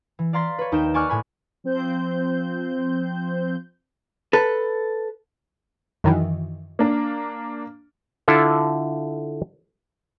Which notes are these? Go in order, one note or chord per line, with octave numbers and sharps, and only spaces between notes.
E3
D5 F5 A#5 C6 A6 B6
B4 C#5
D#2 D#4 A#4 G5 G6 E7
D5 G#5 C#6 D6 F6 F#6
A2 G#5 B5
F3 C4 C5 G6
A4 B4
F#2 D#3 E3
A#3 D4
D3 E4 F4 A4